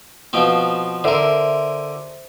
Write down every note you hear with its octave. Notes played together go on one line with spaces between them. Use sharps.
B2 F3 C4
D3 A#4 C5 E5